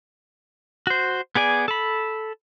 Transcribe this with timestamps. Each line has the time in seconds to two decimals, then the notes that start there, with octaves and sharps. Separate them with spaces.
0.87 F#4 C5
1.35 B3 G#4 D5 G#5
1.68 A4 B5